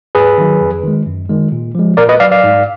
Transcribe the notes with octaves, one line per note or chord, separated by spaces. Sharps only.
G#2 G#4 B4
D#3 F#3
F2
D#3 G#3
F#2
D#3 G#3
A#2
F3 G#3
A#2 A#4 D5
B4 D#5
F#3 D5 F5
D5 F5
G#2